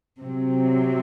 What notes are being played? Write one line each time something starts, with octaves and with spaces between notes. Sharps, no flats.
C3 F#3 C4